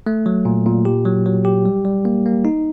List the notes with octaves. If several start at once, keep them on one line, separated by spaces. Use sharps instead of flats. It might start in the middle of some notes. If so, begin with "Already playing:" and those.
A3
F#3
A#2
A#2
G4
F#3
F#3
G4
G3
G3
A#3
A#3
D#4